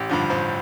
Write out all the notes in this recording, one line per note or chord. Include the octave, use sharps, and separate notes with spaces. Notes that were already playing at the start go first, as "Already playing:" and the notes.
Already playing: A1 G4
G2 D3 F3
A1 C5